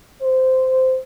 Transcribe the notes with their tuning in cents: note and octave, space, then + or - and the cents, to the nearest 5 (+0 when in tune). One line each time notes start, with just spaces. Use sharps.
C5 -10